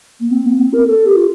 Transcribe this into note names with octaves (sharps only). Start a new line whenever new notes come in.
A#3
C4
A#3
C4
A#4
A4
G4
F4